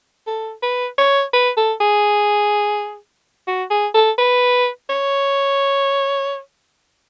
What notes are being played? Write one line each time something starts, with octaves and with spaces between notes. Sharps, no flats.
A4
B4
C#5
B4
A4
G#4
F#4
G#4
A4
B4
C#5